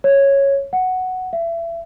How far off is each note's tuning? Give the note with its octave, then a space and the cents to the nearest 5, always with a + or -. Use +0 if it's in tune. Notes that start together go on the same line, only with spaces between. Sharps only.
C#5 -5
F#5 +0
E5 +30